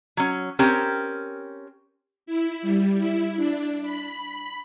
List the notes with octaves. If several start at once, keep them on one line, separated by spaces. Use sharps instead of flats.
F#3 C#4
C4 C#4 G4 A#4
E4
G3
E4
D4
B5